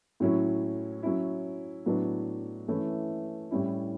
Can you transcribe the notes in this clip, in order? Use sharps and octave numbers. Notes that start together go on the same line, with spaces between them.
A2 F#3 C#4 E4
F#3 C#4 E4
A2 F#3 B3 D4
E3 A3 C#4 E4
A2 G3 C#4 E4